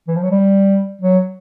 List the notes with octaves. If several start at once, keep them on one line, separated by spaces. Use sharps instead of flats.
E3
F3
F#3
G3
F#3